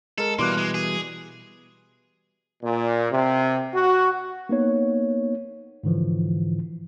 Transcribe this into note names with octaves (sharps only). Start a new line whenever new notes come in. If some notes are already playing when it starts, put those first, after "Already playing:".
G#3 A4 A#4
B2 E3 G3 A#3 E4 C6 D6 F#6
G#3
G#4
A#2
C3
F#4
A#3 B3 D#4 C#5
G#2 D3 E3 F3